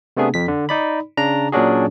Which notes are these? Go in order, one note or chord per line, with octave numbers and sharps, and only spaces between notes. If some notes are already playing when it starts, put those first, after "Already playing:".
C3 A3 B3 D4 G#4
F2 B6
D3
D#4 D5 B5
C#3 D4 A#5
A#2 F#3 C#4 D4 F#4 G#4